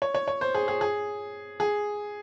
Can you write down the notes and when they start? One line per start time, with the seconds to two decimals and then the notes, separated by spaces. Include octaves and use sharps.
0.02 C#5
0.14 C#5
0.28 C#5
0.41 C5
0.55 G#4
0.68 G#4
0.81 G#4
1.60 G#4